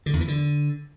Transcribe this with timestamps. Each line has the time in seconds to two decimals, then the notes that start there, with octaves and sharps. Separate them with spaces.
0.06 D3
0.13 E2
0.21 E3
0.28 D3